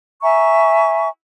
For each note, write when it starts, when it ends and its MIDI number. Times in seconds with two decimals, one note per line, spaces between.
0.23 1.08 76
0.23 1.08 80
0.23 1.08 82
0.23 1.08 85